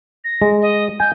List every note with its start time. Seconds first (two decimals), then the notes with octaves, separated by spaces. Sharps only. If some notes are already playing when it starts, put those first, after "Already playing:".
0.25 A#6
0.42 G#3
0.62 D#5
1.00 G#5 G6